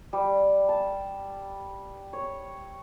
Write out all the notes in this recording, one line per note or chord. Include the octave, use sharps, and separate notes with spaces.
G3
A5
C#5